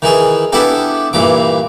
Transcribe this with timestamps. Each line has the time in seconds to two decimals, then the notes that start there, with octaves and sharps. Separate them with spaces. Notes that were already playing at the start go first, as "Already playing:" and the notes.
0.02 D#3 E3 G#4
0.52 B3 D4 E4 G4 A4
1.13 G2 A#2 E3 D6